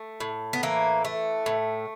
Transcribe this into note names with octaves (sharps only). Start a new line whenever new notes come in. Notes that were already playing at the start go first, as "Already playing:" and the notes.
Already playing: A3
A2
B3
E3 A#3
A3
A2